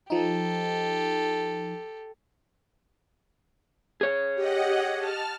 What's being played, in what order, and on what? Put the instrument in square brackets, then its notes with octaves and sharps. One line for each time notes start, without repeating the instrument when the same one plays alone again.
[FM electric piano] F3 D#4 [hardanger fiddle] G4 A4
[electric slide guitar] G#4 C#5
[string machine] G4 D#5 F#5
A5 F6